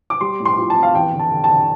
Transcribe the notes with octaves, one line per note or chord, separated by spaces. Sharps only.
D6
G3 C6
A2
C6
F4
A5
C4
F5
E2 G5
D3
A5
D3
A5
D3